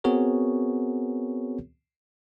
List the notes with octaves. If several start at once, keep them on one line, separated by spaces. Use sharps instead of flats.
B3 C4 F#4 G#4 A#4 C#5